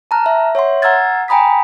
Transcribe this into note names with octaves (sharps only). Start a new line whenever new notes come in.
A5 A#5 F6 F#6
E5
C#5 E5 F#5 C6
F#5 A#5 E6 F6 G#6 A6
G5 G#5 A#5 B5 D#6 B6